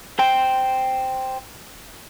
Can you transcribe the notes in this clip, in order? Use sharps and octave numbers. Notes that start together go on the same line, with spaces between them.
C5 G5